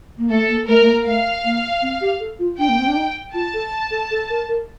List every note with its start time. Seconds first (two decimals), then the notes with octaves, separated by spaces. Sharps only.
0.18 A#3
0.29 A3 A4
0.48 A#3
0.67 A3 A#4
0.81 A3
0.86 A#3
1.05 A3 F5
1.44 A#3
1.82 C4
2.01 G4
2.20 A4
2.39 F4
2.58 D4 G5
2.69 A#3
2.79 C4
2.87 D4
2.96 D#4
3.34 F4 A5
3.54 A4
3.91 A4
4.11 A4
4.30 A#4
4.49 A#4